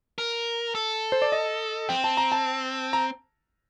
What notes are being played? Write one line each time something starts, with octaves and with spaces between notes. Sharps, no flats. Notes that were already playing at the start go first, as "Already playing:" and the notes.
A#4
A4
C5
D5
D#5
C4 G5
A5
A#5
A5
A#5